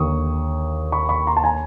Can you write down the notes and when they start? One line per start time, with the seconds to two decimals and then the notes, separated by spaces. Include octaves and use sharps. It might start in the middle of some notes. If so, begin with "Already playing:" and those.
Already playing: D#2 D3 C#6 D#6
0.92 B5 C#6
1.09 B5 C#6
1.27 A#5 C6
1.37 A5
1.44 G#5 A#5